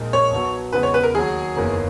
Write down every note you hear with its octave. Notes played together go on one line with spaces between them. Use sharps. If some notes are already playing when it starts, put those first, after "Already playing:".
Already playing: A#1 A#2 G#3 D#4
C#5
B1 B2 F#3
E2 C#3 G#3 B3 B4
C#5
B4
A#4
D#2 D#3 F#3 G#4
F#1 E2 D#3 A#3 C#4